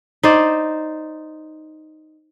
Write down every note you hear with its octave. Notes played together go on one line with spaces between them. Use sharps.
D#4 C5 D5